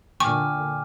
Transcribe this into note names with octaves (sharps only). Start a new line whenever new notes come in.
A#2 D3 G5 G#5 C#6 D6 F6